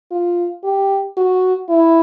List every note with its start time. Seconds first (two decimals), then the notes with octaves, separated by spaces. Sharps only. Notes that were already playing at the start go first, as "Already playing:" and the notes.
0.11 F4
0.64 G4
1.17 F#4
1.69 E4